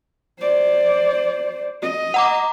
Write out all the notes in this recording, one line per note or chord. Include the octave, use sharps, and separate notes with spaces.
C5 D5
D#5
F#5 A#5 D6